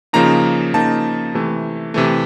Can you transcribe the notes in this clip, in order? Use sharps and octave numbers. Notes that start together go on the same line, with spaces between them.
C#3 F3 A#3 D#4 A#5
C#3 F3 A#3 D#4 A5
C3 E3 A3
C3 E3 A3